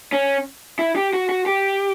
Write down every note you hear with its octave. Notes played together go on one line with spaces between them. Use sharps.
C#4
E4
G4
F#4
F#4
G4